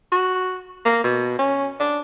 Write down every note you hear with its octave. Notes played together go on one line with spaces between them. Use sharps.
F#4
A#3
B2
C#4
D4